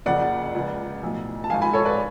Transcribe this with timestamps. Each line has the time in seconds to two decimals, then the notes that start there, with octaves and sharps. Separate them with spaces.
0.06 F#1 F2 C#3 F3 D5 F#5
0.55 C#2 C#3 F3
1.02 B1 A2 F3
1.44 A5
1.50 G#1 G#2 F3 F5 G#5
1.61 G#5 B5
1.73 A4 C#5
1.85 B4 D5